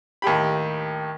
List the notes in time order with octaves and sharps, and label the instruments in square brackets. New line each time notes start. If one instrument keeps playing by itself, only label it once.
[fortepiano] D#2 A2 G4 B5